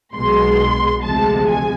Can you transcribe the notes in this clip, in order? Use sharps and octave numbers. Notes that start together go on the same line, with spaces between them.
B1 B2 G#3 C6
D2 C3 F3 G#3 A5
G#5